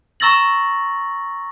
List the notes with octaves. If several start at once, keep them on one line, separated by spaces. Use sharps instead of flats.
A#5 C#6 E6 A6 A#6 F#7